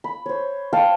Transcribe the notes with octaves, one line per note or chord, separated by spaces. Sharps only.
B5
C5 C#5
F5 G5 A5